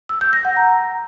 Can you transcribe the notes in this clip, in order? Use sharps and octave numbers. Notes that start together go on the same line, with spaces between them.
E6
G6
A#6
F#5
A#5